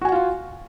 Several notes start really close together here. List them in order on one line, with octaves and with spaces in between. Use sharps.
F#4 G#5 F#5 F4 F5